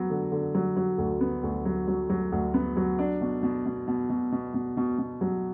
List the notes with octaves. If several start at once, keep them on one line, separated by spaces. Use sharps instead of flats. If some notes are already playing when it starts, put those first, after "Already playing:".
Already playing: F#3 B3
D3
D3
F#3
F#3
D2
B3
D2
F#3
F#3
F#3
D2
B3
F#3
D4
B2
B2
B2
B2
B2
B2
B2
B2
B2
F#3